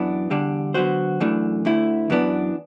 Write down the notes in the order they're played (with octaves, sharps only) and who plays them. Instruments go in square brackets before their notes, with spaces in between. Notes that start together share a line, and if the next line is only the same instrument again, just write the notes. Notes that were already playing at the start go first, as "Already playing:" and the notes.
Already playing: [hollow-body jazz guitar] F#2 E3 B3 D4
E2 D3 G3 D4
D3 F#3 B3 F#4 C5
F#2 E3 A3 D4
D2 D3 A3 E4
F#2 E3 B3 D4